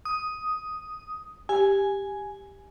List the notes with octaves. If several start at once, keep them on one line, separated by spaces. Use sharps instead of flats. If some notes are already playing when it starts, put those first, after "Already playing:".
D#6
G4 G#5